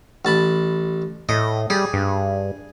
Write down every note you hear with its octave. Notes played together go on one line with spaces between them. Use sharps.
A1 A5 B5
A2 D#5
G3 G#4
G2